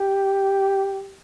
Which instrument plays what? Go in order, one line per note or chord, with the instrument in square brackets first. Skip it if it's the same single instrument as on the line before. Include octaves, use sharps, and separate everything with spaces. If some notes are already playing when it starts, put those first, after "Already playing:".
Already playing: [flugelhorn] G4